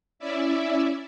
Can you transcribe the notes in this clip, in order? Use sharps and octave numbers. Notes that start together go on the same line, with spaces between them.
C#4 E4 D5 E5